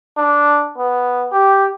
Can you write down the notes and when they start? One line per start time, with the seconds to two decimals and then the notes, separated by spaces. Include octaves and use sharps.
0.18 D4
0.78 B3
1.32 G4